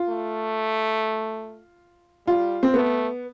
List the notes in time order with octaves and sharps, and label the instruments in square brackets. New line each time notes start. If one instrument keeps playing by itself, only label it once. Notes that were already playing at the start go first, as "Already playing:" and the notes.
Already playing: [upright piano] F4
[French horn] A3
[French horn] G3 [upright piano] F4
[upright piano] C4
[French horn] A3 [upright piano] B3